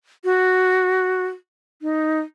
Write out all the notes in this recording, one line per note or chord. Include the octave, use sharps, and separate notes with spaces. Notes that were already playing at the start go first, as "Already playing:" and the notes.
F#4
D#4